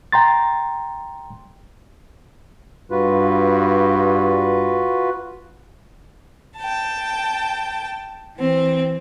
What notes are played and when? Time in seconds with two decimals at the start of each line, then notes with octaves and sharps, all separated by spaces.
0.12 G5 A#5 C6 A6
2.91 G2 F4 F#4 B4
6.58 G5 A5
8.36 E3 C4